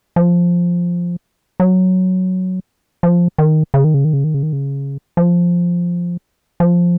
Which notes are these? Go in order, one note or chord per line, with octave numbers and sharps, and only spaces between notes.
F3
F#3
F3
D#3
C#3
D#3
C#3
D#3
C#3
D#3
C#3
D#3
C#3
F3
F3